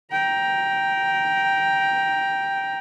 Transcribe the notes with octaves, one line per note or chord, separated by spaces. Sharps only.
G5 A#5